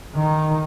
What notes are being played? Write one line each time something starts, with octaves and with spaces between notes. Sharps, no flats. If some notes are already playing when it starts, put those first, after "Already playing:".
D#3